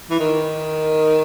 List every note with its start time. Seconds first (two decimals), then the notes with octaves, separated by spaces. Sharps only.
0.10 E3
0.19 D#3